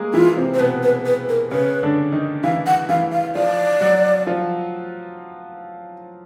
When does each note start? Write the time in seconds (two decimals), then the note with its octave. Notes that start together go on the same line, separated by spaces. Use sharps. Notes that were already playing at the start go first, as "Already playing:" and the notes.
Already playing: G#3 A#3 G#4 A#4
0.14 E3 E4 F4
0.37 C3 C4
0.54 C5
0.59 B2 B3 B4
0.83 B4
1.06 B4
1.29 A#4
1.51 C#3 C#4 B4
1.83 D3 D4
2.12 D#3 D#4
2.44 E3 E4 F5
2.67 F#5
2.89 E3 E4 F5
3.12 F5
3.35 F3 F4 D5
3.81 F#3 F#4
4.27 F3 F4